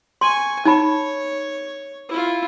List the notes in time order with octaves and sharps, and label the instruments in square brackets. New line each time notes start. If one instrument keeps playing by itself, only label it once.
[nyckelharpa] G#5 C#6 [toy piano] C6
[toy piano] D#4 B5 [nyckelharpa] C#5
[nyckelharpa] E4 F4